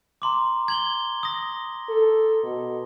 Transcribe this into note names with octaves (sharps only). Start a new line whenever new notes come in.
A#5 C6 D6
G#6 F#7 G7
D#6 A#6
A4
B2